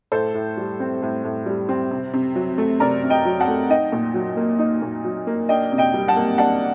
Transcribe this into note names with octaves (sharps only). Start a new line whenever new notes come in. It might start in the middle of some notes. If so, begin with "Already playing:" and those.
A2 A4 C5
A2
G3
C4
A2
A2
G3
C4
C3
C3
F#3
A3
C3 A#4 D5
C3
D#5 G5
F#3
F#5 A5
A3
D#4 D#5 G5
A#2
F#3
A#3
D#4
A#2
F#3
A#3
D4 D#5 G5
C3
D#5 G5
G3
F#5 A5
A#3
D4 F#5 A5